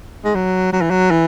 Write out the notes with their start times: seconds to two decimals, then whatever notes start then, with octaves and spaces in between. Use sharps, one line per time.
0.24 G#3
0.35 F#3
0.73 F#3
0.82 E3
0.90 F#3
1.11 E3